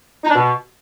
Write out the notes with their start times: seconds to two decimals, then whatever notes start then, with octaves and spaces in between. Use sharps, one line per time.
0.24 D#4
0.30 D4
0.35 B2